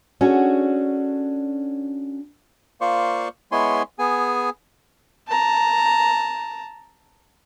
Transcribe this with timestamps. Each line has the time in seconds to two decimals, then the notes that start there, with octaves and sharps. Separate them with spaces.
0.21 C#4 D4 F#4 G#4 A4
2.81 A#3 F4 C5 D5 C#6
3.52 G#3 B3 E4 C#5 G#5 C6
3.99 B3 G#4 G#5
5.28 A5 A#5